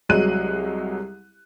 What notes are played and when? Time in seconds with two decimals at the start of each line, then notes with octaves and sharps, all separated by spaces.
0.09 C2 F#3 G#3 F#6 D#7